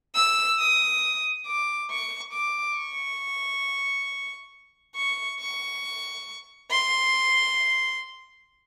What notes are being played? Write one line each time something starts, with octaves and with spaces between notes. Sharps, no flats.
E6
D#6
D6
C#6
D6
C#6
C#6
C#6
C6